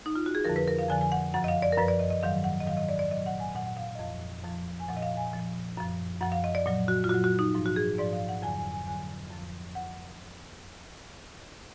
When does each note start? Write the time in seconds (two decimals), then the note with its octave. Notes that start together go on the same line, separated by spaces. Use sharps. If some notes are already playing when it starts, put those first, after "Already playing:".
0.06 D#4
0.15 F4
0.26 F#4
0.35 G#4
0.45 F2 D3 F3 A#4
0.56 B4
0.68 A#4
0.79 F5
0.89 F2 D3 F3 G#5
1.01 G#5
1.12 F#5
1.34 F#2 F3 F#5
1.44 D#5
1.48 F5
1.62 D5
1.72 A#4
1.78 F#2 F3 B4
1.88 D5
1.99 D#5
2.10 D#5
2.23 G#2 D#3 F#3 F5
2.44 F#5
2.60 D#5
2.67 G#2 D#3 F#3 F5
2.77 D#5
2.89 D5
2.99 D5
3.11 A#2 F#3 D#5
3.26 F#5
3.40 G#5
3.55 A#2 F#5
3.58 F#3
3.66 F#5
3.77 F5
3.95 D#5
3.99 F2 F3 F5
4.43 F2 F3
4.80 G#5
4.88 A#2 F3 F#5
4.97 D#5
5.02 F5
5.17 G#5
5.33 A#2 F3
5.77 F#2 F3
6.21 F#2 F3 F#5
6.32 F5
6.44 D#5
6.55 D5
6.66 A#2 F#3
6.88 F#4
7.04 F4
7.09 A#2 F#3 F#4
7.24 F#4
7.39 D#4
7.55 G#2 F3
7.66 F#4
7.76 G#4
7.98 G#2 F3 D5
8.13 F5
8.29 F#5
8.42 F2 D3 F#3 G#5
8.58 G#5
8.73 G#5
8.87 F2 D3 F#3 G#5
9.31 F2 F3
9.75 F#5